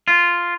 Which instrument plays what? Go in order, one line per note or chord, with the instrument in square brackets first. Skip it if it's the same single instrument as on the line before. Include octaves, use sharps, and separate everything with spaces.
[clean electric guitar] F4